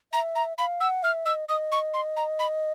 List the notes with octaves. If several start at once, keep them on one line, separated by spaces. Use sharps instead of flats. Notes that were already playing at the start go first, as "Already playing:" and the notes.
E5 A#5
A#5
F5 B5
F#5 E6
E5 F6
D#5 E6
D#5 D#6
C#6
C6
A#5
B5